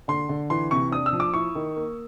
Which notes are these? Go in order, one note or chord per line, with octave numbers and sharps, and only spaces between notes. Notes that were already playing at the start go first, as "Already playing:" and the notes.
D3 C6
D3
E3 C6
C3 C#6
D4 D#6
E6
F3
D6
E4 C#6
D#3
A#3